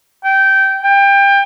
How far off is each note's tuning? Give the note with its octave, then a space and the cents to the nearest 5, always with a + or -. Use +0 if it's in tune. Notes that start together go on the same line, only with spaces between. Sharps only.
G5 -15
G5 +25